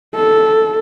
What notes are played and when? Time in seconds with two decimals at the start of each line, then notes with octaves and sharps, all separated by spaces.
0.15 A4